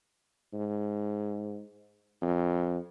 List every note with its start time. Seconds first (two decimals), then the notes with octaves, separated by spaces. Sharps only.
0.54 G#2
2.22 F2